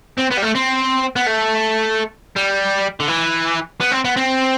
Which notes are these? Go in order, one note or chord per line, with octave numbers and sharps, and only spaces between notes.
C4
B3
G3
A3
C4
B3
A3
G3
D3
E3
B3
C4
B3
C4